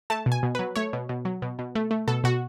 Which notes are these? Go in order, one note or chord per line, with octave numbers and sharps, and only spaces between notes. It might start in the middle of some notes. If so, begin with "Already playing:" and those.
A3 A5
B2
G#5
B2
F#3 B4
A3 C#5
B2
B2
F#3
B2
B2
A3
A3
B2 A4
B2 F#4